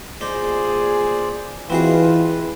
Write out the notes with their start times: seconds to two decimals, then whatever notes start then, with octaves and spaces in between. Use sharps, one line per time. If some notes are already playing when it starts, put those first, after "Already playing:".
0.21 A#2 D#4 G#4 C5 D5
1.70 E3 C4 F4 F#4 G#4 B4 D#5 F5